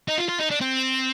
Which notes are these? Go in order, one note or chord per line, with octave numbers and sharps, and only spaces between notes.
D#4
F4
F4
D#4
D4
C4